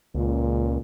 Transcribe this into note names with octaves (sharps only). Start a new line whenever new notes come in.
C#2 A#2